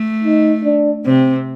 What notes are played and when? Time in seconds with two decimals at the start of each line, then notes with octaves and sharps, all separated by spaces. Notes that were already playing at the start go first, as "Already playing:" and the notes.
Already playing: A3
0.24 D#4
0.64 D4
1.05 C3 C4